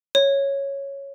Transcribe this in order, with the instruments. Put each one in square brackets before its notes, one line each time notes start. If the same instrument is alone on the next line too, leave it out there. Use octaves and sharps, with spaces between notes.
[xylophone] C#5